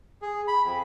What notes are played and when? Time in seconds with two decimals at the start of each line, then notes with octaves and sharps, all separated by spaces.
0.22 G#4
0.48 B5
0.64 F2